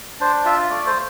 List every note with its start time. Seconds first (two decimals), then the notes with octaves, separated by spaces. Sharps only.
0.20 D4 C5
0.45 F4 E5
0.70 A3 D5
0.86 C5